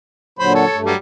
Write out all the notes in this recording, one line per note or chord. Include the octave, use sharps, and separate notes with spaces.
A#2 D3 F#3 C5 B5
A4 C#5
G2 A3
F#3 G3